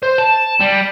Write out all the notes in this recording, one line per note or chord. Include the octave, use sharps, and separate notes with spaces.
C5
A5
G3